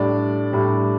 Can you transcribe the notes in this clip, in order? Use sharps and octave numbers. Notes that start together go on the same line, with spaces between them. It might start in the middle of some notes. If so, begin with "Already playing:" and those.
Already playing: A2 G3 D4 D5
A2 G3 D4